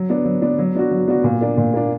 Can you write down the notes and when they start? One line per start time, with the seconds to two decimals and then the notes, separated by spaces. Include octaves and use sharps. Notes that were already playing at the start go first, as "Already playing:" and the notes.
Already playing: F#3
0.09 B3 D4
0.25 F#3
0.42 B3 D4
0.58 F#3
0.74 B3 D4 F#4
0.91 F#3
1.08 B3 D4 F#4
1.24 A#2
1.41 A#3 D4
1.57 A#2
1.74 A#3 D4